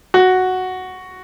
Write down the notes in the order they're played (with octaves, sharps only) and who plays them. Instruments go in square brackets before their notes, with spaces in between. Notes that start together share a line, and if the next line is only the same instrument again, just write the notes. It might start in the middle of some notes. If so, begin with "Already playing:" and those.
[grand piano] F#4